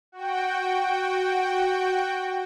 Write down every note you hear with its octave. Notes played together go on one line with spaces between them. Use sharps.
F#4 G5